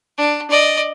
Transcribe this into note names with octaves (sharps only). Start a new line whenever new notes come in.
D4
D5 D#5